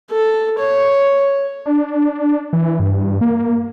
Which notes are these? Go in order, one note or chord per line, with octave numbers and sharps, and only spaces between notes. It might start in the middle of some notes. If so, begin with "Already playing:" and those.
A4
C#5
D4
E3
G2
A#3